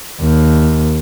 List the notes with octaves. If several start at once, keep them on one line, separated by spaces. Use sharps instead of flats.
D#2